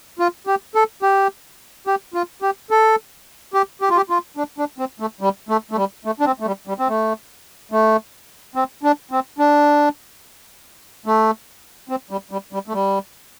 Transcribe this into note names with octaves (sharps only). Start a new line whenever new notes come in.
F4
G4
A4
G4
G4
F4
G4
A4
G4
G4
F4
G4
F4
D4
D4
C4
A3
G3
A3
A3
G3
A3
D4
C4
A3
G3
G3
C4
A3
A3
C4
D4
C4
D4
A3
C4
G3
G3
G3
A3
G3